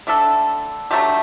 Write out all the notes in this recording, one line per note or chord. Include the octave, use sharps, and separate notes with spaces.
D3 A3 D4 A4
F#3 A3 D4 G4